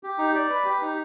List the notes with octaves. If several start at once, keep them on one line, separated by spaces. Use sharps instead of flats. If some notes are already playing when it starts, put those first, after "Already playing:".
G4
D#4
D5
B4
G4
D#4